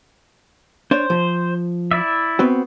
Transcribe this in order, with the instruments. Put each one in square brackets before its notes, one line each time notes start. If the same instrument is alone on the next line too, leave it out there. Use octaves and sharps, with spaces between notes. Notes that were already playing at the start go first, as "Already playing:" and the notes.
[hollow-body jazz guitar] D4 C#5 [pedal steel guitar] C5
[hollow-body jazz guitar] F3
[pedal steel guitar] E4 D5 E5
[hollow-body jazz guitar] B3 C4 F#4